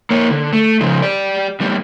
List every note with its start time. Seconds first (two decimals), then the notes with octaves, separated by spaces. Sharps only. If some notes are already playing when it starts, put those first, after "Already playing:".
0.11 A#3 C#5
0.31 D3
0.53 A3
0.81 C#3 F3
1.02 G4 D5
1.60 E2 G3